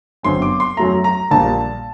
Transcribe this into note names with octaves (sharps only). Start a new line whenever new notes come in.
G1 F#2 F#3 C4 C6
D6
C6
F#2 F#3 A3 A#5
A#5
A#1 A#2 G3 A5